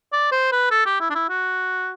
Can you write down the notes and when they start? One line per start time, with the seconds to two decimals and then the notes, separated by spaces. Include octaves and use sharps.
0.13 D5
0.32 C5
0.52 B4
0.71 A4
0.86 G4
1.00 E4
1.10 D4
1.15 E4
1.30 F#4